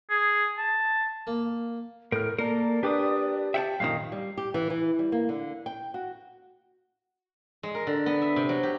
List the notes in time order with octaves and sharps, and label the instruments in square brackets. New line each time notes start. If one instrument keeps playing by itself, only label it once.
[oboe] G#4
A5
[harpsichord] A#3
[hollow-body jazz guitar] A2 [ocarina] A4 [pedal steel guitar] A#4 F6
[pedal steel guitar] A#3 A4 [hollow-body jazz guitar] A#4 [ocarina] D5
[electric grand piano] D4 B4 G5 [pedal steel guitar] G4 D6 D#6
[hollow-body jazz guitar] E5 F#5 A5 [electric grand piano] G5
[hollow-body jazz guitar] F#2 A#2 D#3 [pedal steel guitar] F5
[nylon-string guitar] G3
G4
E3
E3
G3
A#3
D3
G5
F#4
[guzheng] G#3
A#4
D3
B3
E5
C3
F#3
G4